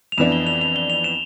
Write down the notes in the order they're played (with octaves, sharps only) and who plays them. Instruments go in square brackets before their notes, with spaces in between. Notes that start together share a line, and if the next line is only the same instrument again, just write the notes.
[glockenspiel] F7
[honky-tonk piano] F2 E3 B3 D4 [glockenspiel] E7
[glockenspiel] G7
F7
F7
G7
F7
E7